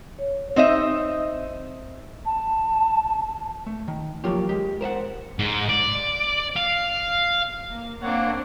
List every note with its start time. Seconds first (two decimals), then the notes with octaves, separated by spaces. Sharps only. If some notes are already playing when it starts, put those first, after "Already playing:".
0.19 C#5
0.56 C4 D#4 D#5 E5
2.25 A5
3.66 A3
3.88 D#3
4.24 F3 F#3 A#3 F4 G4
4.49 G#3 G4
4.81 A#4 C5 E5 F#5
5.39 G#2
5.69 D5
6.56 F5
7.72 A#3
8.02 A#3 C4 D4 C#5 F#5